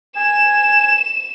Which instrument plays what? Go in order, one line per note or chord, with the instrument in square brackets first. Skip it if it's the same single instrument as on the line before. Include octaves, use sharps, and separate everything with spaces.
[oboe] G#5 [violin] E7